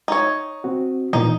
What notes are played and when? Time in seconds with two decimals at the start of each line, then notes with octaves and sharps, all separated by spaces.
0.08 D#4 C#5
0.64 C4 F#4
1.13 A#2 E3 D#4